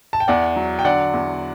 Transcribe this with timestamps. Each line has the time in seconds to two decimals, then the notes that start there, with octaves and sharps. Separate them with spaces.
0.13 A5
0.20 G5
0.28 E2 D5 F#5
0.56 F#3
0.79 G5
0.84 D3 D5 F#5
1.14 E2